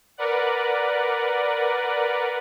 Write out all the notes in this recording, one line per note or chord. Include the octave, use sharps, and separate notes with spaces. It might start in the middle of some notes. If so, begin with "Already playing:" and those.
A#4 B4 D5 F#5